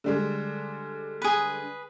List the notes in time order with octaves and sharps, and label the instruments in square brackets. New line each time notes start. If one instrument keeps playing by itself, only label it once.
[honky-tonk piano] D3 G3 G#3
[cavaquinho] G#4 B4